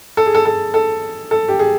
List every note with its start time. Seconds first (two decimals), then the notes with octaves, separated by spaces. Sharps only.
0.17 A4
0.26 G#4
0.35 A4
0.46 A4
0.74 A4
1.31 A4
1.48 G4
1.59 G#4